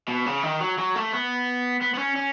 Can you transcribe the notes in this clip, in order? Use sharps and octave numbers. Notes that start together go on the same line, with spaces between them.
B2
C#3
D#3
F#3
F#3
A3
B3
B3
B3
C#4
C#4